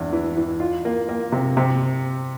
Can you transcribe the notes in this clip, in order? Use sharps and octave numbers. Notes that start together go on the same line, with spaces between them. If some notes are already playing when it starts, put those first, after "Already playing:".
Already playing: E2 D4
E3
E3
F4
A#3
A#3
C3
C3